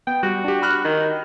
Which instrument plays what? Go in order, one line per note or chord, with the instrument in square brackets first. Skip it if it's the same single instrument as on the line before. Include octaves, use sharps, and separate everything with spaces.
[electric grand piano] B3 [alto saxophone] G5
[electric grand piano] G3 [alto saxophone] F#4
[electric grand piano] D4 G4
B5 F6 F#6
[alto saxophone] D#3